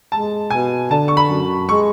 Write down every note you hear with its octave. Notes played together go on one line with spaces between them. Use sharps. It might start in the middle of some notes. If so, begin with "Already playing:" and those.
G#3 A5
B2 G#5
D3 A5
C#6
B5
F#2
G#3 C#6